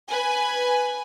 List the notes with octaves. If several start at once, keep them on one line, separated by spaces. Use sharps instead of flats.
B4 G#5